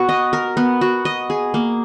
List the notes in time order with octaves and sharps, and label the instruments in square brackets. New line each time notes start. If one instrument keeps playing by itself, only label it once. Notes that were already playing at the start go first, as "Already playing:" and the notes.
Already playing: [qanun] B3 F#4
D#5
A#4
B3
F#4
D#5
G#4
A#3